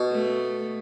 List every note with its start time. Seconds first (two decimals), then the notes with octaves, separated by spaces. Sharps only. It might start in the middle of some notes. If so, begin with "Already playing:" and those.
Already playing: B2
0.11 A3